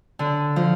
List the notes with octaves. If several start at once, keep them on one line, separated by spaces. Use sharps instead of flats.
D3
F3